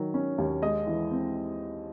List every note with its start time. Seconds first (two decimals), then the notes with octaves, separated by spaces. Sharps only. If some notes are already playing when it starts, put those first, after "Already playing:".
Already playing: D#3 F#3
0.14 C#4
0.38 D#2
0.62 G#3 D#5 D#6
0.87 E3
1.11 C4